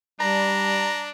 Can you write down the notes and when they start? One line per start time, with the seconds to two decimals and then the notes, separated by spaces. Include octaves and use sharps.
0.20 G3 D4 A#5